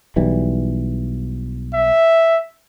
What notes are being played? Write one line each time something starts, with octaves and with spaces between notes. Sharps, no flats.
B1 E3 G3
E5